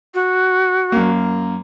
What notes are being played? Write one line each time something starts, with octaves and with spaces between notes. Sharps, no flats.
F#4
F#2 A#3